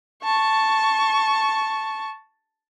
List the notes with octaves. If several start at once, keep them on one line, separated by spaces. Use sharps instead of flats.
A5 C#6